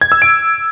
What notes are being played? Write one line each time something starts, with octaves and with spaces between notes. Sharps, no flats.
G#6
E6
D7